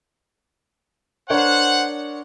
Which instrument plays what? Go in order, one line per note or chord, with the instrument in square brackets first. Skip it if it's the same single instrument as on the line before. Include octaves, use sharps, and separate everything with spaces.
[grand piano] D4 A#4 C#5 [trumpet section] C5 F#5